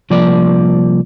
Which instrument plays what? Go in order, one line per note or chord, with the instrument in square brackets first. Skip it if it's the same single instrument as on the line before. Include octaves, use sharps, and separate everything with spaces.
[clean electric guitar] C2 F3 A#3 D5